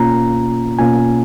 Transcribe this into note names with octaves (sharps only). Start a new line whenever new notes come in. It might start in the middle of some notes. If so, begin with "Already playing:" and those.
Already playing: B2 A#3 C#4 F4 A#5
B2 A#3 C#4 F4 G#5